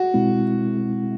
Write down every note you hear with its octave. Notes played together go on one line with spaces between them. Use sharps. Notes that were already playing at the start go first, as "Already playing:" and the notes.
Already playing: F#4
B2 G#3 C4 E4